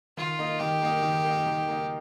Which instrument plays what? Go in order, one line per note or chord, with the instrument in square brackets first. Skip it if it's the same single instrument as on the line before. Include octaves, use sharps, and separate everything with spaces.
[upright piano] D#3 [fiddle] F4
[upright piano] A#3 D#4
[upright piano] D#3 [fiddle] G4
[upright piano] A#3 D#4
D#3
A#3 D#4
D#3
A#3 D#4